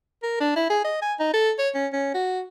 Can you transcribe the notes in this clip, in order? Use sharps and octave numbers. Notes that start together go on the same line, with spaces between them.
A#4
D4
E4
G#4
D#5
G#5
D#4
A4
C#5
C#4
C#4
F#4